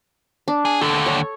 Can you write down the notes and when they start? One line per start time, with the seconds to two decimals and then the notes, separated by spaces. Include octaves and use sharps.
0.48 D4
0.65 G#4
0.81 D#2 D3 A4
1.06 C#5